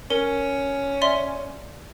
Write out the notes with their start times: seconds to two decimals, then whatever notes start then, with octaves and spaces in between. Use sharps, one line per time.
0.10 C#4 A#4
1.02 D5 E5 C6